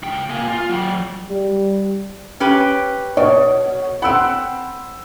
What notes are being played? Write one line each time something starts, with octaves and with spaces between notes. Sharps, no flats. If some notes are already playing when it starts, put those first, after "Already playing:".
C#2 G5
A#3 G#5
F4
F#3 G5
G3
C#4 G4 B4
B2 C#5
C4 F#5 B5 E6